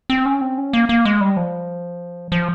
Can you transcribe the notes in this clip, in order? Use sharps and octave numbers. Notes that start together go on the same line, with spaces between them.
C4
C#4
C4
C#4
A#3
A#3
G#3
G3
F3
F3